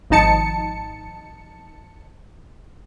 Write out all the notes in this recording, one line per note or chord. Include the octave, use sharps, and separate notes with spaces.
G#1 F3 D#4 A5 C#7